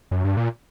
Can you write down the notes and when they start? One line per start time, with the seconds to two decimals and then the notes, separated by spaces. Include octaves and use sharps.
0.11 F#2
0.24 G2
0.37 A#2